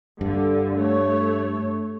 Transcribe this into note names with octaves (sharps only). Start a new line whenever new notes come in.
G2 D3
A3 C#5